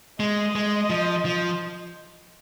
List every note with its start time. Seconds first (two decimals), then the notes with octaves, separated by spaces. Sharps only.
0.20 G#3 D#5
0.56 G#3
0.90 F3
1.25 F3